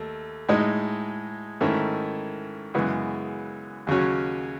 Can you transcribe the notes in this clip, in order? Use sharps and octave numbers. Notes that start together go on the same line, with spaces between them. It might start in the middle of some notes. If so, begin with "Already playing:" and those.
Already playing: D#2 A3
A2 G#3 D#4
G#2 D#3 A3 C#4 E4
F#2 C#3 E3 G#3 B3
D#2 C#3 F#3 C#4